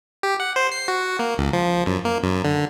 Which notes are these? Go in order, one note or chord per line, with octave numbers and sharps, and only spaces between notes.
G4
F#5
C5
C7
F#4
A#3
C#2
F3
F#2
A#3
F#2
D3